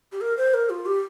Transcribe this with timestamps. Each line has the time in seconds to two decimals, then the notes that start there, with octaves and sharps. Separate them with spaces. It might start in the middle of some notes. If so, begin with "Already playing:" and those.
0.12 G4
0.21 A#4
0.37 C5
0.54 A#4
0.70 F4
0.86 G4